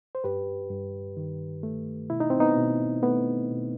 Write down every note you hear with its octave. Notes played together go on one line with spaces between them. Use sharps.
C5
G2 G4 B4
G2
D#3
A3
B2 E4
D#4
C4
B3 D#4
B2
A3 B3
B2